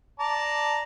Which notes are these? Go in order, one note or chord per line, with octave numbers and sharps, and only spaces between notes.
D5 A5 A#5